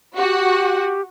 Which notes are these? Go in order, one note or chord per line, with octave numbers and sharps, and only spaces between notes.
F#4 G4 F#5